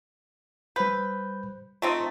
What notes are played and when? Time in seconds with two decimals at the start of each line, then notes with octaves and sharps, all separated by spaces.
0.76 G3 B4 C5 G6
1.82 A3 C4 D#4 F4